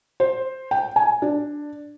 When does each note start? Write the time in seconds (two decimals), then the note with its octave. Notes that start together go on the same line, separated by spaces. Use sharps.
0.20 C5
0.71 G5
0.96 G#5
1.22 D4